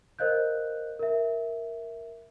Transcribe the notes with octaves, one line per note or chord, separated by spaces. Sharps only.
A#4 C5 D#5 F5 F#6 G6
A#4 E5